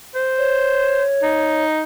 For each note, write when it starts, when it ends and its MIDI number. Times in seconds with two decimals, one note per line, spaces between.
0.15 1.03 72
0.38 1.65 73
1.23 1.83 63